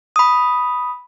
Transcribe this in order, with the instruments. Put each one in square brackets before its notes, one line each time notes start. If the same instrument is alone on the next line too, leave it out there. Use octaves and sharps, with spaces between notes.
[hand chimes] B5 D#6